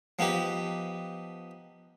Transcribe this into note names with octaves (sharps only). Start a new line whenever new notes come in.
F3 B3 D#4 G4